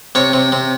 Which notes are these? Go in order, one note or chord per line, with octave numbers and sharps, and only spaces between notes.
C3 C#5
C3
C3